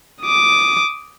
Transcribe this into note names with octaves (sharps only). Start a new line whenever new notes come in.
D6 D#6